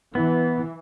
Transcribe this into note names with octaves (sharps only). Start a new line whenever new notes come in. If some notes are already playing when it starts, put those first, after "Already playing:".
E3 B3